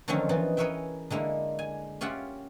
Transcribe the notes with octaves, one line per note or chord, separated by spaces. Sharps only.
D3 D#3 F3 F#3 C4 C#4
E3 F3 B3 D#4
G#4 A#4 B4 C#5 E5 G5
D3 G#3 A#3 E4
G#5
C#4 F4 G4 E5 F#5